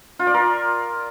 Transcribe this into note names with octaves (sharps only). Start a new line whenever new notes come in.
F4
D5
A#4